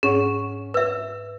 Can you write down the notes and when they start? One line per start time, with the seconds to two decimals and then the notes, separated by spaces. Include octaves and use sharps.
0.03 G#2 C#4 G#4 F#5 C#6
0.74 B4 E5 E6